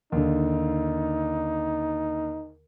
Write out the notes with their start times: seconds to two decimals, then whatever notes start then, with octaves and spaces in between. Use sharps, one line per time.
0.12 D#2 D3 D#4